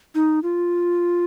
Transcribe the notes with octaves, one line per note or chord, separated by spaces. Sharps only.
D#4
F4